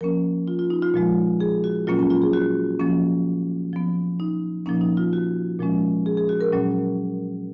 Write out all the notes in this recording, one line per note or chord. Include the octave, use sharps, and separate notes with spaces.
F3 A#3 C#4 A#4
F4
F4
D#4
F4
A#2 F3 G#3
G#4
F#4
A#2 F#3 A#3 C#4 F4
C#4
F4
G#4
F#4
F3 A#3 C#4
F3 B3
D#4
A#2 F3 A#3 C#4 D#4
D#4
F4
F#4
A#2 F3 G#3 C#4
G#4
G#4
F#4
A#4
A#2 F#3 C#4